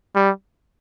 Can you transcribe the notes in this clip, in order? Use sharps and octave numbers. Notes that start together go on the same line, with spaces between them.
G3